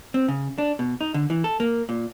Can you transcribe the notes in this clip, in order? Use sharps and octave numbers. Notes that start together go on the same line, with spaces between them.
C4
C#3
D4
B2
D#4
D3
E3
A4
A#3
A#2